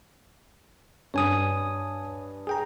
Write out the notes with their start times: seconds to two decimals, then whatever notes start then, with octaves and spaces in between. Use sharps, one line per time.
1.14 G2 C#5 G#5 D#6
2.47 G#4 G5 A#5